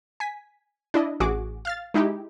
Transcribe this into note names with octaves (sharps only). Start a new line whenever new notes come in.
G#5 B6
D4 E4 D#5
A1 F#4 G#4 D6
F5 F6 A6
G#3 D#4 E4 G4